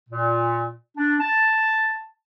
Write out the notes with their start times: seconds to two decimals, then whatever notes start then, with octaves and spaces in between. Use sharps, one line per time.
0.09 A#2
0.97 D4
1.21 A5